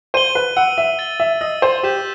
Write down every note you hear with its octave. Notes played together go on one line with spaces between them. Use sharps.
C5 D#7 G7
B4
F#5 E6
E5
A6 D#7 G7
E5
D#5 E6
C5
G4 G6 B6 E7